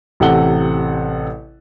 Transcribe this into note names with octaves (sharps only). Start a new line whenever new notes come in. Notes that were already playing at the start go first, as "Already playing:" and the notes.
A1 C3 A4 F#5 G7